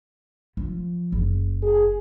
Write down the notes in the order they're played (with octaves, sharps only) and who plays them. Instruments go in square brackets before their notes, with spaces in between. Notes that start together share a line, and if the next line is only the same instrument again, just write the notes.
[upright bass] F3
F#1
[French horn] G#4